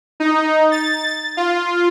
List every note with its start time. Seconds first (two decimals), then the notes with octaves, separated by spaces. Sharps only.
0.20 D#4
0.72 A6
1.37 F4